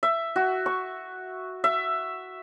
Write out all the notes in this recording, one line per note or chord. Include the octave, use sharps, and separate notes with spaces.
E5
F#4
C#6
E5